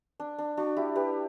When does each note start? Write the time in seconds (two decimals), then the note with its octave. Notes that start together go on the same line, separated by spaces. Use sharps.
0.20 D4
0.38 D4
0.57 D4 F#4
0.76 E4 G4
0.96 G4 B4